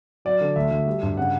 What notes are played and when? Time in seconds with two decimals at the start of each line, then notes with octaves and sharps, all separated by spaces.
0.25 F#3 D5
0.41 D3
0.56 D2 E5
0.71 D2
0.87 G3
1.03 G2
1.17 C#3 F#5